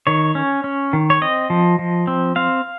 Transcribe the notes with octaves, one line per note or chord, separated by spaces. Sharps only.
D#3 C#5
C#4
C#4
D#3
C#5
C4 D#5
F3
F3
C4
C4 F5